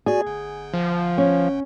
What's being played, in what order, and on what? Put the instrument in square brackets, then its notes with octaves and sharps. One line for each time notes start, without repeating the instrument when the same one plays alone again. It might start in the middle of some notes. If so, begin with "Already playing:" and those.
[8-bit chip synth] F#4 D5 G#5 [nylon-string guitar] G#4
[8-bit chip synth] G1
[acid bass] F3
[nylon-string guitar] C#4